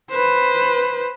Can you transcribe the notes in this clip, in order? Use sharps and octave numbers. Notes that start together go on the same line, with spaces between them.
B4 C5